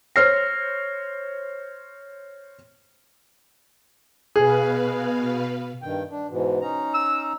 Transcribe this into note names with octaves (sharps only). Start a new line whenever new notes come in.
C5 C#5 F6 A#6 C7
B2 G#4 B4 F5
G2 D#3 G5
D4
G#2 B2 E3
C#4 D#4 A#5
E6